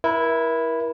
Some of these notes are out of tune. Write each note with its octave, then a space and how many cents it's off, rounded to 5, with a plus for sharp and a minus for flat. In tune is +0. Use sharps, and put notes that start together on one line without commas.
E4 +0 A#4 +40